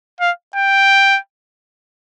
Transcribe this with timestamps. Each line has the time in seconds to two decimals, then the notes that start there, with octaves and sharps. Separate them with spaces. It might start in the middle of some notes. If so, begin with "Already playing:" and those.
0.20 F5
0.55 G5